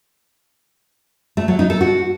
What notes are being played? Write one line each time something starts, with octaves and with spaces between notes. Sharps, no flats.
A3
F#3
D#4
A4
F#4